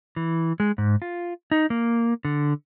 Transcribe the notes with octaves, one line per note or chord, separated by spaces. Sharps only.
E3
G#3
G#2
F4
D#4
A#3
D3